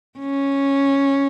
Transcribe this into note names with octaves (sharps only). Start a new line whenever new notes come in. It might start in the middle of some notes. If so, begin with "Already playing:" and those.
C#4